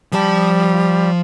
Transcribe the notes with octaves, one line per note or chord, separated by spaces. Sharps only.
F3 G3 A5